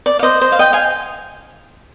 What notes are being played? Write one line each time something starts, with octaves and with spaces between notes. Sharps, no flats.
D5
F5
C5 D#5
C5 D#5
F5
D#5 G5
F5 G#5